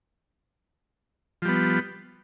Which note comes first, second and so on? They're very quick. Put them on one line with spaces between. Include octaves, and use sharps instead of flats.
F3 G3 B3